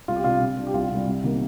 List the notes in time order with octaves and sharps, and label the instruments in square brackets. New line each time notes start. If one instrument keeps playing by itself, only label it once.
[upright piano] C2 F4
G4
C3 G3 D4 F4
C3
G3 D4
G4
C2 F4
C3 G3
C2
C3 D#3 A#3 D#4